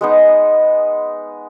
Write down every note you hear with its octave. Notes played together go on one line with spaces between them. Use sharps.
G#3 B3 D#4